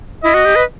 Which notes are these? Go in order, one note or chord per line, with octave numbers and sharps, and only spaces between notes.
E4 D#5
F#4
G4
B4